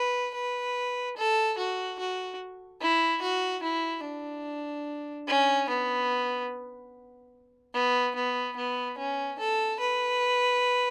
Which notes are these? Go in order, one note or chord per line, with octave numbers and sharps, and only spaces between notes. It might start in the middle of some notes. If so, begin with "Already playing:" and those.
Already playing: B4
B4
A4
F#4
F#4
E4
F#4
E4
D4
C#4
B3
B3
B3
B3
C#4
A4
B4